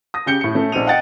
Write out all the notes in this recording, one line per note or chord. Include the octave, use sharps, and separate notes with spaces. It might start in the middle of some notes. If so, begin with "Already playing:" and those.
D#6 A#6
C#3 G4 G6 C#7 G7
A2 C#7
A3 C#4
A#1 C4 D#4 D#7 F7
D#5 F#5 G5 A6 C#7